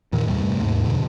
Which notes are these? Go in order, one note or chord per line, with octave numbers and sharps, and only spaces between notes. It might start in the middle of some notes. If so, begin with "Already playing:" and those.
E2 A#2 D#3
G2 C3 G3 A3
D#2 G#2
F2 B2 D3